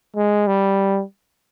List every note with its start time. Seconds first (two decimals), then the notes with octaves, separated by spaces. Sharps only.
0.17 G#3
0.47 G3